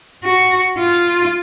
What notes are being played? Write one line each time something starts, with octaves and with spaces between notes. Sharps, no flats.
F#4
F4